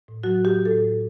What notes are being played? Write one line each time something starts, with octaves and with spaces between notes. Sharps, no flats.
A2
F#3 F#4
A2
G4
F#3
A4
A2